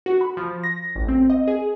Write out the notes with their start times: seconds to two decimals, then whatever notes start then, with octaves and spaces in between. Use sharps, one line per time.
0.06 F#4
0.21 B5
0.37 F3
0.64 A#6
0.96 A1
1.08 C4
1.30 D#5
1.47 G#4